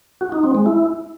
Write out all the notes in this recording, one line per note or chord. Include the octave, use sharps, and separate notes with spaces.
F#4
D#4
C4
G#3
E4